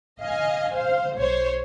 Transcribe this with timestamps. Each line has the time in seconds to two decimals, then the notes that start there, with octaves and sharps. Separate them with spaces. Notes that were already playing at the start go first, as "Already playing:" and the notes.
0.21 D#5 F5 G#5
0.73 C5 F5
1.18 B1 C5 C#5